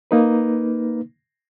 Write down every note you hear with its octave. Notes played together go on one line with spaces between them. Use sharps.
A#3 D#4 B4